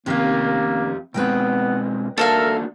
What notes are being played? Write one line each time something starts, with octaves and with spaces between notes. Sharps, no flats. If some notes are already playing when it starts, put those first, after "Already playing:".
F2 C3 D#3 A#3 C#4 G4 F5
B2 G#3 B3 C4 B4 D#5 G5
A#3 D4 F#4 A4 A#4 E5 F5